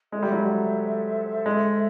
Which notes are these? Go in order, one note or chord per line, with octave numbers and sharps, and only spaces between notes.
G#3 A4 C5 E5
G3
F#3
G3
G#3